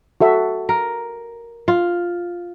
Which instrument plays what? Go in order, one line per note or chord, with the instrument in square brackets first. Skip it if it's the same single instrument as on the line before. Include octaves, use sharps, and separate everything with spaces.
[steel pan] F#4 A4 E5
[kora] A#4
F4